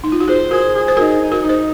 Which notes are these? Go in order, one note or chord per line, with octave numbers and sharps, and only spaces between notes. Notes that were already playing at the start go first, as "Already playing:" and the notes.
D#4
F4
F#4
F4 G#4 C5
F#4 G#4 A#4
G#4
C5
D#4 F#4 A#4
D#4
F#4 A#4
D#4
G#4 C5